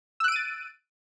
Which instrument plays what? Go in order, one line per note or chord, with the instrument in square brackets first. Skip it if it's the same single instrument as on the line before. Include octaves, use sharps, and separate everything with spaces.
[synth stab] E6
F#6
D7
D#7
A6